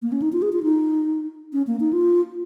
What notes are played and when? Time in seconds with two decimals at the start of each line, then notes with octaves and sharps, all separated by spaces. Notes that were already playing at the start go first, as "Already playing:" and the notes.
0.02 A#3
0.12 C#4
0.22 D#4
0.33 F4
0.42 G#4
0.53 F4
0.63 D#4
1.53 C#4
1.67 A#3
1.80 D#4
1.93 F4